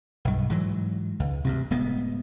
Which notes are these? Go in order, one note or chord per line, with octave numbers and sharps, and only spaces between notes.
B1 G2
G#2 E3 F#3
C#2
D2 G2 C3
D1 D2 G#3 B3